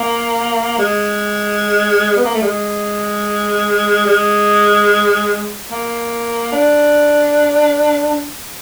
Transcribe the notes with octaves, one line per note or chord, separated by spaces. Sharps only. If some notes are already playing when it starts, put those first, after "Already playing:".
Already playing: A#3
G#3
B3
A#3
A3
G#3
G#3
A#3
D4